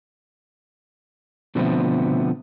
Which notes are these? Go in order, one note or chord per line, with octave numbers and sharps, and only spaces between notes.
B2 D3 F3 A3 B3 C4